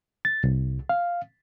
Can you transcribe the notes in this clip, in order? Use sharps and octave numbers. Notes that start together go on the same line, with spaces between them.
A6
C2
F5